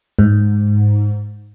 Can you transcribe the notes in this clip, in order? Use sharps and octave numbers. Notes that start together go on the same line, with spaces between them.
G#2